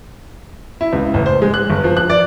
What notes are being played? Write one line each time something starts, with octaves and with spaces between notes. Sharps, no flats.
E4
C#2
A1
C5
G#3
F#6
G1
F3
F#6
D5